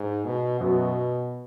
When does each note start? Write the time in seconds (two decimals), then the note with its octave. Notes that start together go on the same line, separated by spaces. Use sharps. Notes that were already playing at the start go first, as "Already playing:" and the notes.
Already playing: G#2
0.25 B2
0.60 F#2 B2 F#3 B3 F#4